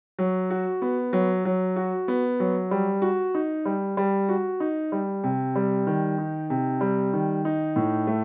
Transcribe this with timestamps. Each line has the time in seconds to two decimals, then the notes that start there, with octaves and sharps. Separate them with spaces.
0.19 F#3
0.50 F#4
0.82 B3
1.13 F#3
1.45 F#3
1.76 F#4
2.08 B3
2.40 F#3
2.71 G3
3.02 F#4
3.34 D#4
3.65 G3
3.97 G3
4.29 F#4
4.60 D#4
4.92 G3
5.24 C3
5.55 G3
5.87 D#3
6.18 D#4
6.50 C3
6.81 G3
7.13 D#3
7.45 D#4
7.76 A2
8.07 A3